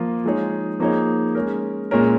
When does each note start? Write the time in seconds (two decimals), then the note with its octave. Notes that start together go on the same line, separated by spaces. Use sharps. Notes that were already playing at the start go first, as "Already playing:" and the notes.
Already playing: F3 A#3 F4
0.24 F3 G#3 D#4 G#4 C#5
0.79 F3 A#3 D#4 G#4 C#5
1.35 G#3 C#4 A#4
1.91 A#2 G#3 C#4 A#4